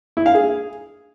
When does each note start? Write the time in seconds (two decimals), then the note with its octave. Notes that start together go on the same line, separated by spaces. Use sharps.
0.17 E4
0.26 F5
0.35 G#4